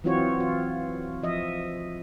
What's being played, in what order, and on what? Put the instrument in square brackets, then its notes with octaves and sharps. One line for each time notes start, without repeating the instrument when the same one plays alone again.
[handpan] E3 F#3 C4 F4 F#4 C#5
F4
F3 D#5 E5